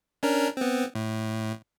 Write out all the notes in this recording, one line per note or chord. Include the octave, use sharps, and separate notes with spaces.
C#4 D4 A#4
B3 C4
A2